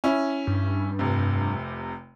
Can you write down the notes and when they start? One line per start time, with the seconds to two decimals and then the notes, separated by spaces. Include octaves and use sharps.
0.04 C#4 E4
0.47 G2
0.99 F1 C3